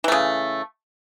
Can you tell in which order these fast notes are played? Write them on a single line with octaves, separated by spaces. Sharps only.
E3 A3 C#3